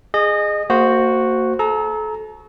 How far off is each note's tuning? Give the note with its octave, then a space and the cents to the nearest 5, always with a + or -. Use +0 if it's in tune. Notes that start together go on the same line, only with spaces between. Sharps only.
G#4 +0 D#5 -25
A#3 -30 F#4 +0 C5 +0
A4 -35 A#5 +0